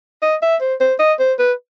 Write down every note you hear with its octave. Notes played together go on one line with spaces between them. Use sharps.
D#5
E5
C5
C5
D#5
C5
B4